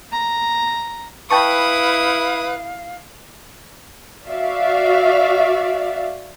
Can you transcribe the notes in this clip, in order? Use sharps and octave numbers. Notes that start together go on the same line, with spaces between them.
A#5
E4 B4 F5 G5 A5 C#6 D#6
F#4 D5 E5 F5